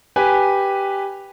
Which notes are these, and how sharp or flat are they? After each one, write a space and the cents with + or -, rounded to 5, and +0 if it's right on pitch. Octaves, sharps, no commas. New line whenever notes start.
G4 +0 B4 +0 G#5 +0